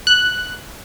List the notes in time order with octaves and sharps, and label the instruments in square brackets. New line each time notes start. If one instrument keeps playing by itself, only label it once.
[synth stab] F#6